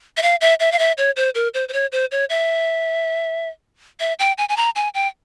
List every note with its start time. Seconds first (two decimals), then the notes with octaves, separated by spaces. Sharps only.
0.17 E5
0.22 F5
0.41 E5
0.60 E5
0.72 F5
0.79 E5
0.98 C#5
1.16 C5
1.35 A#4
1.54 C5
1.69 C5
1.73 C#5
1.92 C5
2.12 C#5
2.30 E5
4.00 E5
4.19 G5
4.38 G#5
4.49 G#5
4.57 A#5
4.76 G#5
4.94 G5